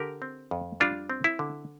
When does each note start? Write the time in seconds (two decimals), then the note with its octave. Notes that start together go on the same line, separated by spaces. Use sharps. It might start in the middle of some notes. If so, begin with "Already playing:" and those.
Already playing: D3 G4 A#4
0.22 C4
0.51 F2
0.80 G3 D4 F4
1.10 C4
1.24 E4
1.39 D3